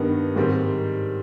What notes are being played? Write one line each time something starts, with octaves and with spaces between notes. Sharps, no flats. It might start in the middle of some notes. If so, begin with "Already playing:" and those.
Already playing: G2 D#3 G3 B3
G#2 D#3 G3 C4